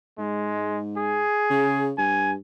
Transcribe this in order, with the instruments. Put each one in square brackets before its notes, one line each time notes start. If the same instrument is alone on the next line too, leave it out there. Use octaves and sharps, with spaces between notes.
[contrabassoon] G#2 [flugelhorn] G#3
[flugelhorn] G#4
[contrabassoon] C#3
[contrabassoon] G2 [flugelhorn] G#5